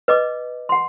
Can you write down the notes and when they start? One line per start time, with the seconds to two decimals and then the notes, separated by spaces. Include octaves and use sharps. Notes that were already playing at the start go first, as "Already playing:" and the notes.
0.08 B4 D#5 D6
0.69 F#5 C6